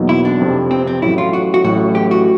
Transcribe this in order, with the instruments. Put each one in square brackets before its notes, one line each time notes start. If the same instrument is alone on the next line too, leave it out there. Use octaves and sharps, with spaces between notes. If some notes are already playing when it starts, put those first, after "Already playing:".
Already playing: [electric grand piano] E2 B2 F#3 A#3 D#4
[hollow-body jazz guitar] E4
D4
[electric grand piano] F2 C3 F3
[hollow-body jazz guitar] C4
C4
[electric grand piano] A1 A2 F#3 [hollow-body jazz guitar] E4
[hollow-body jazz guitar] F4
F#4
F#4
[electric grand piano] A1 A2 F#3 [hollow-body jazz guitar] F#4
[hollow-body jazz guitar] G4
F#4